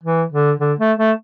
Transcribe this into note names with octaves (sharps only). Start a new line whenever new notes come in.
E3
D3
D3
A3
A3